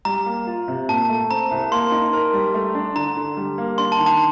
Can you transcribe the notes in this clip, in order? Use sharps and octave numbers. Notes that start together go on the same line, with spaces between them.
G3 A#5
A#3
F4
C3
A#2 A5
A3
C4 A#5
C2
A#3 C6
D#4
A#4
G3
A3
D4
D3 A#5
D3
G3
A#3
D4 C6
A5
D#3
A5